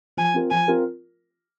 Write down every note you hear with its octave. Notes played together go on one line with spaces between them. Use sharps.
F3 G#5
C4 F4 A#4
F3 G#5
C4 F4 A#4